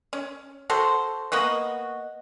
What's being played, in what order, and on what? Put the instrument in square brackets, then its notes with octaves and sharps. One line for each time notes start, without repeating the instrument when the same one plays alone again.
[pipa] C#4
F#4 A4 C5
A#3 B3 F#4 D#5